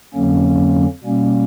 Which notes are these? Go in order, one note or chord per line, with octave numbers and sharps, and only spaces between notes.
F2 D3 F#3 A#3 C#4
B2 G3 A#3 C#4